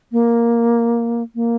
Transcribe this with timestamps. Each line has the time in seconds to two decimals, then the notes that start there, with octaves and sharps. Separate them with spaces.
0.12 A#3
1.35 A#3